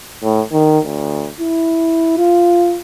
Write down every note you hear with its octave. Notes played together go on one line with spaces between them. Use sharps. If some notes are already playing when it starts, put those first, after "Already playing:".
A2
D#3
D2
E4
F4